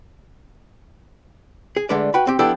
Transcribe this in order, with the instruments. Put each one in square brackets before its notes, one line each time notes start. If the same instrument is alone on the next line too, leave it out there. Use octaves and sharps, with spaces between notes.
[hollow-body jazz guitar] G#4
D3 G#3 A3 D4 B4 D5
F#4 B4 G5 B5
C4 G4
F3 B3 D4 E4 G4 A4